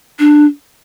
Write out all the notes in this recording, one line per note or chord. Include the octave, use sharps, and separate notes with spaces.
D4